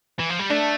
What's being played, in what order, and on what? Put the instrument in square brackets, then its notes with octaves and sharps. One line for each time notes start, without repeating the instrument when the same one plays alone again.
[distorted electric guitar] E3
F3
G3
[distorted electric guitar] A3 [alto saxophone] D4